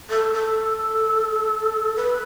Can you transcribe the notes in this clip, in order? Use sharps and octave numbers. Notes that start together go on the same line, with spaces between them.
A4
A4
B4